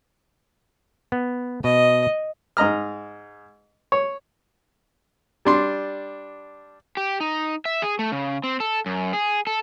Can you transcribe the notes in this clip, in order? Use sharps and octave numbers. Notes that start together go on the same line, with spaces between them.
B3
B2 D#5
G#2 D#5 A#5 F6
C#5
G3 D4 C6
G4
D#4
E5
G#4
A3
C#3
C4
A4
F#2
G#4
A4